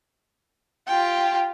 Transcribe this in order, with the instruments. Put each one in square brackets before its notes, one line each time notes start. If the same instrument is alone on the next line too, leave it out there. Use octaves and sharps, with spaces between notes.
[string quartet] F4 G4 [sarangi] G5